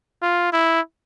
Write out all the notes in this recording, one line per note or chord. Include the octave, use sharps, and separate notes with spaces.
F4
E4